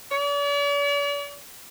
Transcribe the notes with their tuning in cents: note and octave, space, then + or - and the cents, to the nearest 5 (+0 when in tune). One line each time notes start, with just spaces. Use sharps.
D5 -45